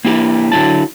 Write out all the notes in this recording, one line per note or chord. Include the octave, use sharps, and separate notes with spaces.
A#3 E4 G4
D3 F#3 E4 A5